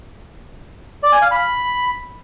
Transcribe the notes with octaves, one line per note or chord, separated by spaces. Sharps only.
D5
G#5
F5
B5